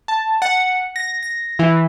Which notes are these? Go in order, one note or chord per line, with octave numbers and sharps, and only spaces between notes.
A5
F#5
A#6
A#6
E3